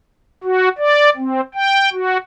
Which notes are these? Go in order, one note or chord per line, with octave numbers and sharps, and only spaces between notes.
F#4
D5
C4
G5
F#4